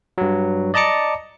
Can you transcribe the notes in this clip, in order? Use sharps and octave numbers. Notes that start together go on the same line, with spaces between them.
G2 F#3
D5 D#5 A5 A#5 D6 C#7